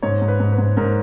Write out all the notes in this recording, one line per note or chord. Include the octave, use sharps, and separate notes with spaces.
G#2 C#5
G#2
B4
G#2
B4
G#2
G#2 A#4